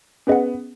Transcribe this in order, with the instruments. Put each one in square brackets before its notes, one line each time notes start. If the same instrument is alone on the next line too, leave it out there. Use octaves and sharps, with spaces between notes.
[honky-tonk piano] B3 [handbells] C#4 G#4 D#5 F#5